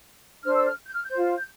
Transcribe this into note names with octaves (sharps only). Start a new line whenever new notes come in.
D4 A4 C5 F6
E6
F6
G6
F6
G6
F4 C5
G6